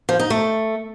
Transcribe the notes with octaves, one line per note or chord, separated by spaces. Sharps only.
F3
D#4
A3